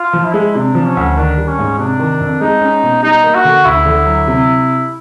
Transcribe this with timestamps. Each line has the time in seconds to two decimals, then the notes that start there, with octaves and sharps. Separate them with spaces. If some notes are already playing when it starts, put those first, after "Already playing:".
Already playing: F4
0.13 F3
0.24 E4
0.34 G#3
0.55 C3 D4
0.75 F3
0.86 C#4
0.97 D2
1.17 D#3 D4
1.37 G3
1.48 C#4
1.59 G#2
1.78 C3 D4
1.99 D#3
2.20 F2
2.41 G#3 D#4
2.61 C#4
2.83 B2
3.03 G3 D#4
3.23 A#3
3.35 F#4
3.45 D3
3.65 D2 E4
3.86 D3
4.06 F#3
4.27 C3